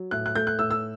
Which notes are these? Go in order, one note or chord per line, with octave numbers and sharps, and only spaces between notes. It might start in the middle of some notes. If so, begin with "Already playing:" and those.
Already playing: F#3
A2 F#6
F#6
A3 G6
F#6
A2 E6
E6